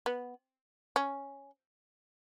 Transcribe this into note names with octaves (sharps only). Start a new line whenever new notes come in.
B3
C#4